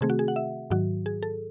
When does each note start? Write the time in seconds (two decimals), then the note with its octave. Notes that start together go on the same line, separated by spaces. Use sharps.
0.01 C3 D#3 A3 C4 G#4
0.10 F#4
0.19 G#4
0.28 F#5
0.36 E5
0.71 G#2 D#3 F#3 F#4
1.06 G#4
1.23 A4